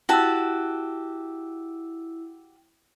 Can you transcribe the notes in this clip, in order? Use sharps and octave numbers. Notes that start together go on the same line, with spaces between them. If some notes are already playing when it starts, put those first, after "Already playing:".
E4 F#4 G4 A5 E6